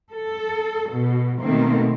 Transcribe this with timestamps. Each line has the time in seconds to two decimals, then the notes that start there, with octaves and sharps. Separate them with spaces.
0.11 A4
0.91 B2
1.40 B2 D#3 A3 A#3 C4